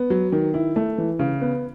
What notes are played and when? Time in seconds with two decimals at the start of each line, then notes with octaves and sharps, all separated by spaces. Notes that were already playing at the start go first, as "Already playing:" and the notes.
Already playing: B3
0.10 F#3
0.32 D#3
0.54 E4
0.76 A3
0.98 E3
1.19 C#3
1.41 B3